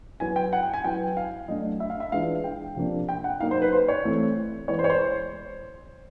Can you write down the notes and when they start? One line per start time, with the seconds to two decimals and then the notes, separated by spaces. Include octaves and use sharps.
0.20 F#3 B3 E4 G#5
0.36 G5
0.53 F#5
0.63 G5
0.74 G#5
0.84 F#3 B3 E4 G5
1.17 F5
1.48 F#3 A3 D4 D#5
1.80 E5
1.90 F5
2.00 E5
2.12 E3 G#3 B3 D4 F4 F5
2.44 G5
2.76 C3 F3 A#3 D4
3.09 G5
3.24 F#5
3.40 F#3 A#3 D#4 F5
3.51 C5
3.62 B4
3.72 C5
3.88 C#5
4.04 E3 A3 C4
4.68 E3 G#3 B3 C#5
4.79 C5
4.84 C#5
4.90 C5